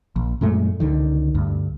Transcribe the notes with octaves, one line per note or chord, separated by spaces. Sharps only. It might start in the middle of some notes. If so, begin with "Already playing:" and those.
A#1
F#2 A#2 G#3 A3
C#2 D3 D#3
D2 G2